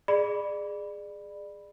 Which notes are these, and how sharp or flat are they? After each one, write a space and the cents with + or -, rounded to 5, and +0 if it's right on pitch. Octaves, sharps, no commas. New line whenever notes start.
G#4 -5 D5 +25 B5 +0